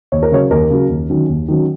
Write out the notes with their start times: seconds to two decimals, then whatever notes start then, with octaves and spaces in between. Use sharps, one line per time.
0.12 D#2 C#5
0.23 A#4
0.32 C#3 F#3 C#5
0.51 D#2 A#4
0.70 C#3 F#3
0.89 D#2
1.09 D#3 F#3 C#4
1.29 D#2
1.48 D#3 F#3 C#4